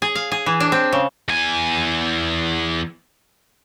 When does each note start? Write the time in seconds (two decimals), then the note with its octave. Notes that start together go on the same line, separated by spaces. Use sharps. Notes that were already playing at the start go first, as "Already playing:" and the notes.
0.02 G#4
0.15 F5
0.32 G#4
0.46 E3
0.60 D4
0.72 C4
0.93 C#3
1.29 E2 G#5